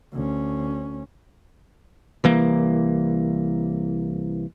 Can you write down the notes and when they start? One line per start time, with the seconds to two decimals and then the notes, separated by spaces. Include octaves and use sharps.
0.13 D2 C#4
2.24 C2 E3 A#3